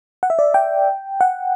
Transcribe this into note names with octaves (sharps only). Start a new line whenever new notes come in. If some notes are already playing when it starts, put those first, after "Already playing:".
F#5
E5
D5
G5
F#5